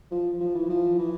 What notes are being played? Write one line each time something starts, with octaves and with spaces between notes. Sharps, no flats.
F3
F3
E3
F3
E3